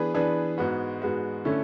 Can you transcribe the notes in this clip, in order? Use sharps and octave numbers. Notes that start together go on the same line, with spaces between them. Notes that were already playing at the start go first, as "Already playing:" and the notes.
Already playing: E3 B3 D4 G#4 B4
E3 B3 D4 G#4 B4
G#2 G#3 B3 F#4
G#2 G#3 B3 F#4
D3 A3 C#4 E4